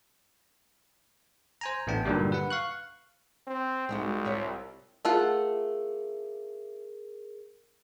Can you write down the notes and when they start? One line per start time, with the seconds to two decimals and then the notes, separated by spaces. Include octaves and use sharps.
1.61 C5 G#5 A#5
1.87 A1 A3 B3 D4 G5 A5
2.05 G2 A#2 D3 D#3 F#3 G3
2.32 B4 F#5
2.50 F5 C#6 F#6
3.47 C4
3.89 C2 G#3 D#4 F#4
4.25 E4 F4 C#5
5.05 A3 F4 G#4 A#4 F#5